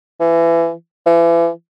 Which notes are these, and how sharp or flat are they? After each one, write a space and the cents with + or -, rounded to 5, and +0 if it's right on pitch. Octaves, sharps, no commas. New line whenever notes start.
E3 +25
E3 +35